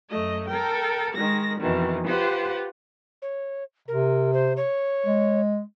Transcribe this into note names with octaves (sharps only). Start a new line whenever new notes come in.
F#2 A3 D#5
A4 A#4 G5
D#3 G#3 A#6
F2 B2 D#3 E3
F4 G4 B4 C5 F#5
C#5
C3 A#4
C5
C#5
G#3